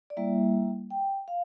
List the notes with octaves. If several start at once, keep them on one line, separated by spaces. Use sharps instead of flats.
D5
G3 A#3 E4 E5
G5
F5